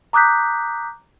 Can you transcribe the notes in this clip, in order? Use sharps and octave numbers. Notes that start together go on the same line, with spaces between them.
A#5 D6 D#6 F#6 G6 B6